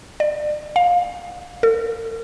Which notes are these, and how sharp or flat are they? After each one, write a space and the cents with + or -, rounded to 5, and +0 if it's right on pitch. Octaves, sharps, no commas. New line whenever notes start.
D5 +35
F5 +20
A#4 -45